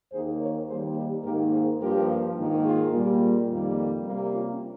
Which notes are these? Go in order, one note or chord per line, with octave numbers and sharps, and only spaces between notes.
D#2 D#3 A#3 G#4 C5
A#4 C#5
D#2 D#3 G3 A#3 G#4 C5
D#4 G4
G#2 D#3 A#3 G4 A#4
G#4 C5
G2 F3 A#3 G4 A#4
G#2 D#3 A#3
F4 G#4
A#2 G3 A#3
F2 D#3 G3 A#3
C3 G3 A#3
C#4 F4